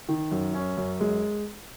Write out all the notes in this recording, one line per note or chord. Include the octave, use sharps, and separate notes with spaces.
D#3
F#2
C#4
F#2
G#3